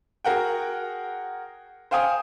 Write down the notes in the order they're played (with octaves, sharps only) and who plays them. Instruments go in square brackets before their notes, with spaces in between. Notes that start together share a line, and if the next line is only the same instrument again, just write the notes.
[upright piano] F#4 G#4 A#4 F#5 G5
C5 F5 G5 G#5 D#6